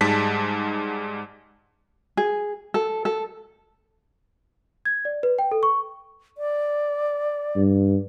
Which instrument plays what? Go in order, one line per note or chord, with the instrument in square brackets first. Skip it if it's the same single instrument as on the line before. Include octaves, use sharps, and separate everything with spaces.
[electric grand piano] G#2 G3 G#3 A5 B6
[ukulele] G#4
A4
A4
[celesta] G#6
D5
B4
G5
A4
C#6
[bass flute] D5
[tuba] G2